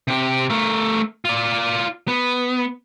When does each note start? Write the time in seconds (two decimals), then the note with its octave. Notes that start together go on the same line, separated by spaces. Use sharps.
0.08 C3 G4
0.50 A3 A#4
1.25 F4 D5
2.08 B3